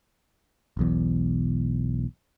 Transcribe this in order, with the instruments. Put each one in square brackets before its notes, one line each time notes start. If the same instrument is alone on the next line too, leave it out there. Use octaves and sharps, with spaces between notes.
[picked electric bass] E1 B1 E2